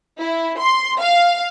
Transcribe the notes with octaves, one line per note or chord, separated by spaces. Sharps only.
E4
C6
F5